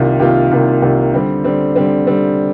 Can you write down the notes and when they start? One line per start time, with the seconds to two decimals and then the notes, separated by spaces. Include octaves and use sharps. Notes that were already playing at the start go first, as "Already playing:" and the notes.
Already playing: C2 C3 D#3 A#3 F4
0.20 C2 C3 D#3 A#3 F4
0.51 C2 C3 D#3 A#3 F4
0.82 C2 C3 D#3 A#3 F4
1.14 D3 G3 C4
1.44 D3 G3 C4
1.76 D3 G3 C4
2.07 D3 G3 C4